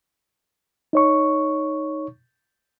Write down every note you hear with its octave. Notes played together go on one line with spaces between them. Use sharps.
D#4 C#5 C#6